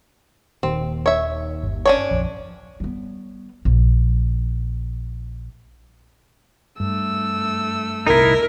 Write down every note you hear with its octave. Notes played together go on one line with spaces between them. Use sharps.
D#1 D#2 C4
C#5 E5
G1
C#4 D4 C#5
A#1 F2
G3 B3
A#1
G2 A3 E6
D#1 C2 C3 D#4 E4 A#4